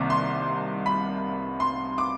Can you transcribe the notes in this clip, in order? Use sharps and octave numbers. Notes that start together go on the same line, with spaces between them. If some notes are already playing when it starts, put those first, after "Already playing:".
Already playing: C2 C3 D#3 G3 A#3 D6
C6
B5
C6
D6